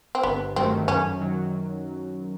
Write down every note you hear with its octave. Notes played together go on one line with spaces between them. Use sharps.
C4
G1 B3
G2 D#3 F#3 A3 C4
F#2 C#4
D#3 F#3